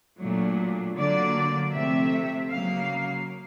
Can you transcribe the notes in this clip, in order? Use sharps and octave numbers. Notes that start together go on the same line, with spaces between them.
A#2 F#3 A3 D4
D3 F#3 A#3 D5
C3 F3 A3 C4 E5
C#3 F#3 A#3 F5